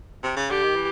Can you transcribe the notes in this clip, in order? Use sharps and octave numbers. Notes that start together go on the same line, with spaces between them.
C3
C#3
D3 G4
D#3
E3